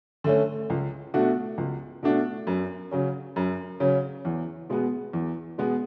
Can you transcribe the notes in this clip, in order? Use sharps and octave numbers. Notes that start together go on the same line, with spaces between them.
D3 A3 C#4
C#2
B2 A3 D4 F#4
C#2
B2 A3 D4 F#4
F#2
C#3 F#3 C#4
F#2
C#3 F#3 C#4
E2
B2 G#3 B3
E2
B2 G#3 B3